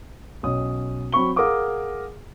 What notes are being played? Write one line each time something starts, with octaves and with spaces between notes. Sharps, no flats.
B1 C#4 D#6
F#3 C4 B5 C#6 G7
G#4 A#4 F5 F#5 D6 D#6